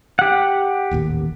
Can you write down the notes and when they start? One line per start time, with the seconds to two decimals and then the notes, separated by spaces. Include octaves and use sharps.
0.19 G4 F#5
0.91 D#1 A1 D#2